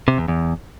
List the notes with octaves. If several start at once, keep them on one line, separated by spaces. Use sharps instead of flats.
C3
E2
E2